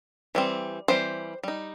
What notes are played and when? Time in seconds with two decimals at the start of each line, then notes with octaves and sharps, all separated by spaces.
0.35 E3 G3 C4
0.88 E3 G3 C4 C5
1.43 G3 D#4